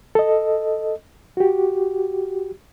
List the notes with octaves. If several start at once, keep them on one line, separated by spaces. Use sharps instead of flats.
A4 D#5
F#4 G4